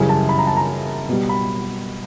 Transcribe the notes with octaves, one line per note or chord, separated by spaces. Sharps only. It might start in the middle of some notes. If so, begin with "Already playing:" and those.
Already playing: F#2 C#3 E3 G3 G#5
A5
B5
A#5
A5
A#5
B2 G3
B5